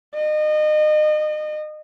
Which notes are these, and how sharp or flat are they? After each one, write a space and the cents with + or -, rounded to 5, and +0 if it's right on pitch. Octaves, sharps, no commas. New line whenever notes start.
D#5 -30